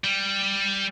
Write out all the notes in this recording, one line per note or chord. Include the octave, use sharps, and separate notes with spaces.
G3